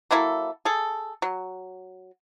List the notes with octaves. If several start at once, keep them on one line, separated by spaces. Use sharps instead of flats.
F#3 A#3 E4 A4
G#4 A4
F#3